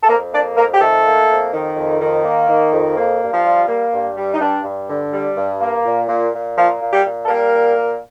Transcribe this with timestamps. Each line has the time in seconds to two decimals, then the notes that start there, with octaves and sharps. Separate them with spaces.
0.03 A4
0.09 F2 A#3 A#4
0.32 A#3 D4 D5
0.56 F2 A#3 A#4
0.73 G4
0.81 D#3 A3 A4
1.05 A#3
1.29 F2
1.53 D#3
1.77 F2
2.01 D#3
2.25 A#3
2.49 D#3
2.72 F2
2.97 A#3
3.21 G2
3.32 F3 F4
3.45 G3
3.68 A#3
3.93 G2
4.17 G3
4.34 D#4
4.40 G2 D4
4.65 G2
4.89 D3
5.12 G3
5.37 G2
5.60 A#3
5.85 A#2
6.08 A#2
6.33 A#2
6.56 F3 A#3 F4
6.81 A#2
6.93 G3 G4
7.05 A#2
7.25 A4
7.28 G3 A#3 A#4
7.53 A#2
7.77 A#3